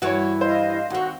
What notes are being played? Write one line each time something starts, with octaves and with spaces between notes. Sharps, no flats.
G2 E3 E4 F#4 C#5
C5 D#5 F5
D#2 C4 F#4 F#5